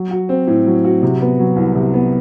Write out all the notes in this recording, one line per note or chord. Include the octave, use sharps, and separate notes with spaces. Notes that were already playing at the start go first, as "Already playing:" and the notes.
Already playing: F#3
F#4
C4
A2
F#3
F#4
C3
B3
F#3
C2
C3
B3